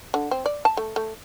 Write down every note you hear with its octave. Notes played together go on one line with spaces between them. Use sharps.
D3
C4
D5
A5
A3
A3